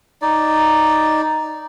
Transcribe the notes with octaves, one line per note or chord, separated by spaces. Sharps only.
D#4 D5